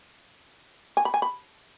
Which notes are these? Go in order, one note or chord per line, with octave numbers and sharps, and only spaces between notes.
G#5
B5
G#5
B5